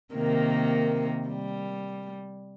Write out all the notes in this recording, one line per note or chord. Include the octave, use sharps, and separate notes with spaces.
C3 D#3 A#3
G3